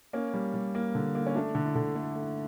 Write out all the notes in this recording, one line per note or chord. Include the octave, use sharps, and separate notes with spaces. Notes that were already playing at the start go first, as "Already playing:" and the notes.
A#3 C#4
G3
G3
A#3
D3
A#3
C#4
A3 D4
D3
E4
D3
A3
A3